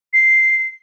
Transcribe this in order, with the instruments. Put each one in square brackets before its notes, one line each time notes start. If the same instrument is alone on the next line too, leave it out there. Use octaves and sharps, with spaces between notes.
[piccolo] C7